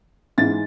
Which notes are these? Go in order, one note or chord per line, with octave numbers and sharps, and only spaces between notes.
G#2 E3 G#3 A6